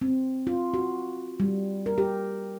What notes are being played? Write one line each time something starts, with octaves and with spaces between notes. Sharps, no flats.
C4
F4
F#4
G3
A#4
G4